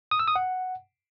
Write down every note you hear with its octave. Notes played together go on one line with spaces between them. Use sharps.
D#6
E6
D#6
F#5